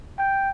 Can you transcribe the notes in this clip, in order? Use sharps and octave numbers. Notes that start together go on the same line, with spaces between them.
G5